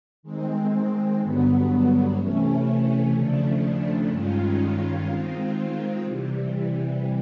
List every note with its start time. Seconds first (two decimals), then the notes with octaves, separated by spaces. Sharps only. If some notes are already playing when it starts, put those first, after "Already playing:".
0.23 D#3 G#3 C4
1.20 G2 D3 F#3 B3
2.16 C3 E3 A3 C#4
3.13 D#2 C#3 F3 A3 D4
4.09 G2 D#3 G#3 C#4 F4
5.06 D#3 G#3 C4 F4
6.03 C3 E3 G3